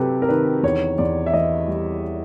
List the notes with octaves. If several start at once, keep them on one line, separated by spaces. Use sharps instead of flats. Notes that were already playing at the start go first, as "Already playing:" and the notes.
Already playing: C3 F#3 G4 A4 B4
A#4
D#3 B4
E2 C#5
E2 D5
E5
E3 D#5
G3